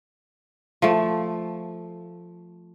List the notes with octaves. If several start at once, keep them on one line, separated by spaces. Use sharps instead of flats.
F3 A3